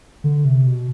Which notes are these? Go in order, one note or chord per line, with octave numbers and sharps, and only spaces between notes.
D3
C3
B2